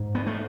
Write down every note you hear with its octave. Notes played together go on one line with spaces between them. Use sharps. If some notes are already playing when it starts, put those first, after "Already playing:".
Already playing: G#2
B3
A3